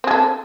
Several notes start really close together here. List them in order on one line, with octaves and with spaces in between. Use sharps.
C4 G#4 A4